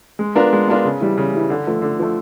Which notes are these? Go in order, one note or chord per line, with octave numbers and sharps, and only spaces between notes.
G#3
B3 D4 F4 A#4
G#3
B3 D4 F4 A#4
C#3
E3 G3
C#3
E3 G3
D3
F3 A3
D3
F3 A3